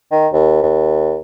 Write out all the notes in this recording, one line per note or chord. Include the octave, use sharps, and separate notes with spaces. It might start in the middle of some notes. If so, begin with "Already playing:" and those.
D#3
D#2
D#2